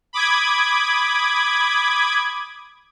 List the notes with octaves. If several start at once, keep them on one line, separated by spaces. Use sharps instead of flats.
B5 D6 D#6 G#6